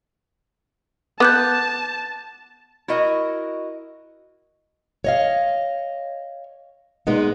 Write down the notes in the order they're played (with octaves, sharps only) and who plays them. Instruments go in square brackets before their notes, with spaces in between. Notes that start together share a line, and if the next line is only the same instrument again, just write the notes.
[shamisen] B3 [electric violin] A5 [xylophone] D6 F#6 G6
[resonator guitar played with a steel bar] E4 F#4 A#4 D#5
[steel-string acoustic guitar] C#5 D#5 F5
A#2 G#3 B3 D#4